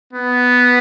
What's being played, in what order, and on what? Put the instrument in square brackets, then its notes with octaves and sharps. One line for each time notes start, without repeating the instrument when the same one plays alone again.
[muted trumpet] B3